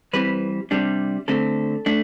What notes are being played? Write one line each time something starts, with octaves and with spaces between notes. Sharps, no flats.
E3 G3 C4 B4
C3 G3 D4
D3 A3 C4 A4
A3 D4